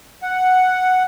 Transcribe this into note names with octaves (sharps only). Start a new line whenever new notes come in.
F#5